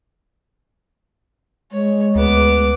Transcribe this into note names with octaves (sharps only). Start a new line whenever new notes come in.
G#3 C#5
D2 B3 D6